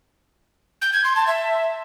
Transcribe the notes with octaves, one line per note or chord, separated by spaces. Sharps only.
G6
G#6
C6
A5
E5